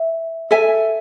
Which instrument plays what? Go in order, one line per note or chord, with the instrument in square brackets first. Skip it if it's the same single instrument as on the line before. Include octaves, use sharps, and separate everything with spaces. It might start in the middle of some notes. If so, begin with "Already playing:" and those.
Already playing: [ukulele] E5
A4 E5 G#5